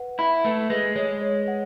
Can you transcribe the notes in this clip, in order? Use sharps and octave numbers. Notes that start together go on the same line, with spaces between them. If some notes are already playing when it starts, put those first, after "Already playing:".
Already playing: B4 F#5
E4 B5
A3 B4
G#3 B4
G#3 C#5
C#5
F#5